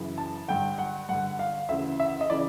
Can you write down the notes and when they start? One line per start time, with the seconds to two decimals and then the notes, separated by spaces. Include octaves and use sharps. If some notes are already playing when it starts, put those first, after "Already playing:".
Already playing: F#2 C#3 E3
0.18 A5
0.48 G2 D3 G5
0.78 F#5
1.09 G2 D3 F#5
1.39 F5
1.69 D2 C#3 E3 E5
2.00 E5
2.21 D#5
2.30 C#3 E3 D5